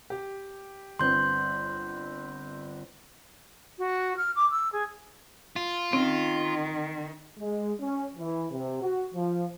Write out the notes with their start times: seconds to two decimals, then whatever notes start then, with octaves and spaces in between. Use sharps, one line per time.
0.10 G4
0.99 G1 C4 B4 C6 G6
3.79 F#4
4.17 F6
4.36 D6
4.51 E6
4.72 G#4
5.56 F4
5.93 D#3 C4 C#4
7.39 G#3
7.80 C#4
8.16 E3
8.52 C3
8.82 F#4
9.14 F3